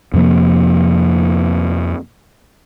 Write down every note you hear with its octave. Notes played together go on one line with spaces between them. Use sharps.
F2 C3 F3 A#3